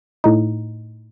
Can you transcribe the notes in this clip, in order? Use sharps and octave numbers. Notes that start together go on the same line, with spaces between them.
A2 D#4